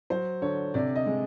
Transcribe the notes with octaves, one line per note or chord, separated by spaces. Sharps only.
F#3 C5
D3 C#5
C3 D5
D#5
G#3